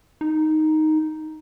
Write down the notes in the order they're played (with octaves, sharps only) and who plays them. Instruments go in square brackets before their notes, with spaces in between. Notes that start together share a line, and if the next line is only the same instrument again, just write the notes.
[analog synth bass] D#4